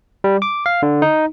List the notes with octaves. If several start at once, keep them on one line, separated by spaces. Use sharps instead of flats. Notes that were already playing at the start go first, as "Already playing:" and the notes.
G3
D6
F5
D3
D#4